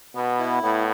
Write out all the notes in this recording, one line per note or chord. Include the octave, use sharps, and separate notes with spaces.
B2 B3
E4
A2 B3